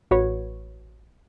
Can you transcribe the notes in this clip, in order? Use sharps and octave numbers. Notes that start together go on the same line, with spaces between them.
A1 F#4 B4 C#5